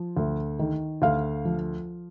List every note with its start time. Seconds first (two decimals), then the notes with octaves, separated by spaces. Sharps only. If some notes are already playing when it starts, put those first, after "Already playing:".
Already playing: F3
0.17 D2
0.59 D#3
1.02 D2 F5
1.45 F3